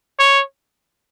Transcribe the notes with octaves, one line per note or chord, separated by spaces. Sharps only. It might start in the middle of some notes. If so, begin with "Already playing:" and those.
C#5